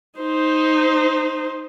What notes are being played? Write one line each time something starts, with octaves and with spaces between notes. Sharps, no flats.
D#4 C5